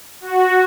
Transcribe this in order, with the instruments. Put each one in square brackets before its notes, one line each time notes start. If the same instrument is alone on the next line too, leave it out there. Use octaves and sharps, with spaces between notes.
[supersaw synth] F#4